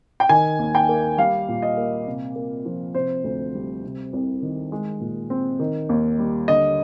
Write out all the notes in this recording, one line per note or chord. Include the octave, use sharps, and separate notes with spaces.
G5
D#3 G#5
D#2
G5
A#3
G3 F5
A#2
D#5
A#3
C3
A#3
F3
C3 C5
D2
G3
C3
C2
D#3
G#3
A#2
C4
D#3
D#2
G3
D3 D#5